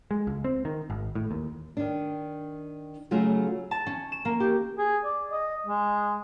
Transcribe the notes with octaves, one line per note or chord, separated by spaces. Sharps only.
G#3
C#2
C4
D#3
G#1
A2
D#2
D#3 D4
C#3 F#3 A3 F4 F#4 G#4
A5
C#4
E7
A#3
G4
G#4
D5
D#5
G#3